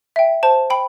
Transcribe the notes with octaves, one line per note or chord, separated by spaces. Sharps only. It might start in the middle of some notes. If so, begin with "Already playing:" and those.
E5 G5
C5 A5
G5 B5